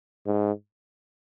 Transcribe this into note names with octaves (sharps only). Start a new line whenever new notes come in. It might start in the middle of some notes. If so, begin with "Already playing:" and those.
G#2